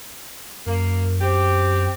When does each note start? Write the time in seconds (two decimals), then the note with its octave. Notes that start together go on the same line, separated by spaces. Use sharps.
0.66 F#2 A#3
1.20 C4 G4